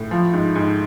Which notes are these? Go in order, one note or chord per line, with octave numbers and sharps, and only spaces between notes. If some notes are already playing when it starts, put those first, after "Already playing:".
Already playing: A2
F3
G#2
G#2